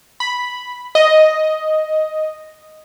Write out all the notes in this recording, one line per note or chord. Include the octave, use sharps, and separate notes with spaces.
B5
D#5